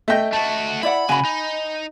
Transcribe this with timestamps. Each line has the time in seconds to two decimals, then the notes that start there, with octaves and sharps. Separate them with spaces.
0.08 A3 D#5 E5 G5
0.33 A3 F#4 A5
0.83 E4 D5 F#5 B5
1.09 C#3 F#4 G#5 B5
1.25 D#4